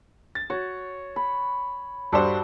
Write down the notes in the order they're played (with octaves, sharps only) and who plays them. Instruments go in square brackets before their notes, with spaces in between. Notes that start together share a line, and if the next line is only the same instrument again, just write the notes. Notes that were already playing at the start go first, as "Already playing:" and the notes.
[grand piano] A6
[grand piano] F#4 [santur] C#5
[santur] B5
[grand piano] G2 G3 C5 [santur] D4 F#4 A4